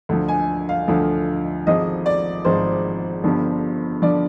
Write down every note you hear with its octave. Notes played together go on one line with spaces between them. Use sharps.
D2 D3 F3
G#5
F5
D2 D3 F3
G#1 G#2 F3 D#5
D5
G#1 G#2 F3 C5
G1 G2 D3 F3
D3 F3 D5